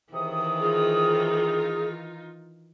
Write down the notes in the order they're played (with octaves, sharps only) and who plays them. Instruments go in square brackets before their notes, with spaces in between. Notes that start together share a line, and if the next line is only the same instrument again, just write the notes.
[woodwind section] C#2 C3 D#6 [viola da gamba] D#3 E3
[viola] D#4 F4 [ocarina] G#4